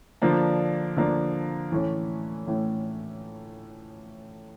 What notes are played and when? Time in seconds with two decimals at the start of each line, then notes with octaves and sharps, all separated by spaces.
0.22 D3 F3 A#3 D4
0.97 D3 F3 A#3 D4
1.72 A2 E3 A3 C#4
2.47 A2 E3 A3 C#4